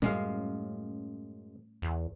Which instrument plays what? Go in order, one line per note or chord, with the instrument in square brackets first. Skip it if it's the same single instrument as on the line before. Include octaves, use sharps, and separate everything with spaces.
[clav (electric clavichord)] F#2 G#3 F5 [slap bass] A2 G3 C#4
[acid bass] E2